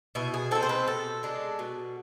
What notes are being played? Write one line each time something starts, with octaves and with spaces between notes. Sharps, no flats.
B2 E4
G#4
G#3 C4 A4
C5
B4
B2 A4
G#3 D4
B2